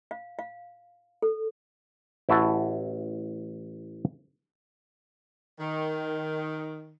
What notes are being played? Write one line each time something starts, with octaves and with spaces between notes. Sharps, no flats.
F5
F5
A4
A1 E4 F#4 A5
D#3